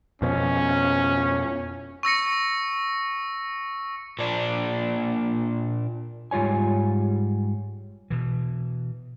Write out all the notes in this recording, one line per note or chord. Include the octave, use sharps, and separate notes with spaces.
F2 B2 F3 C#4
C#6 E6 A#6 C#7
A#2 D4
G#2 G3 F4 C#5 G#5
B2 E3